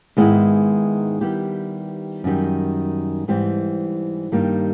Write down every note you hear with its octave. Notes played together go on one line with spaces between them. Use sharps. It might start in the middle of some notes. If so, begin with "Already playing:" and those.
G#2 D#3 G#3 B3 E4
D#3 G3 B3 E4 G4
F#2 D#3 G3
G#2 E3 G3 C4
G2 D#3 G3 A#3 D#4